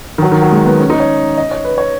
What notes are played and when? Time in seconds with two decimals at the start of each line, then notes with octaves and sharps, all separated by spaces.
0.18 D#3
0.22 F#3
0.32 D#3
0.42 F#3
0.52 G#3
0.66 B3
0.80 C#4
0.90 D#4
1.00 C#5
1.38 D#5
1.51 C#5
1.65 B4
1.78 C#5